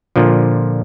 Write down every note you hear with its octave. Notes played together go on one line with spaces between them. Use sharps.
A#2 D3 F3